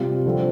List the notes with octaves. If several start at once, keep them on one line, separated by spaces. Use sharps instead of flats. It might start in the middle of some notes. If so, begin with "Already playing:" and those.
Already playing: C3 G3 F4
D3 F3 C4 F4